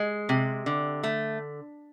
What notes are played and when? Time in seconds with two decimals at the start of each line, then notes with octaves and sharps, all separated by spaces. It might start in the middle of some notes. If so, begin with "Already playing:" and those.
Already playing: G#3
0.29 C3
0.66 D3
1.03 A3